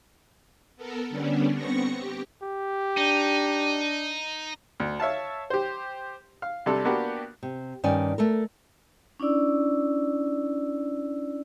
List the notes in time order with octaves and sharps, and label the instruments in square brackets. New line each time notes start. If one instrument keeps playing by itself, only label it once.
[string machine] B3 A4 A#4
D3 G3 B3 C#4 D4
B3 C4 C#6 A#6 C#7
G4
[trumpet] G4
[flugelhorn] D4 [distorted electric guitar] D#4
[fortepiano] D2
C#5 E5 F5 A5
G4 C5
F5
C3 G3 D4 G4 A4
A#3 B3 D4 F#4 G4
[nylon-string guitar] C3
G2 D#3 C#4 D5 G#5
A3 A4 A#4
[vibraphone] C#4 D4 E4 D5 E6